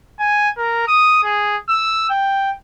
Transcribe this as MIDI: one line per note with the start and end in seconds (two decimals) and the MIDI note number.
0.19 0.49 80
0.58 0.86 70
0.88 1.19 87
1.23 1.57 68
1.69 2.09 88
2.10 2.51 79